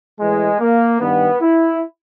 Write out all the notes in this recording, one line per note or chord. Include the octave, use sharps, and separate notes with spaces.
A2 E3 G#3
A#3
G2 D#3 B3
E4